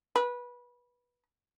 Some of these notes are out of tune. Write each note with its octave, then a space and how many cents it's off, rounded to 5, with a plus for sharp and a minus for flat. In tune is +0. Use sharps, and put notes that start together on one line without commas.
B4 -20